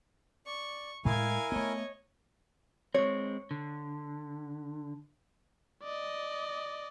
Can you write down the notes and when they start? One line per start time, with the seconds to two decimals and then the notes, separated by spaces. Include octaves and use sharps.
0.46 D5 C#6
1.05 A2 G#3 E4 A#4 F5 G#5 G#6
1.52 A3 B3 C#5 D#5
2.94 G#3 C4 C#5
3.51 D3
5.83 D5 D#5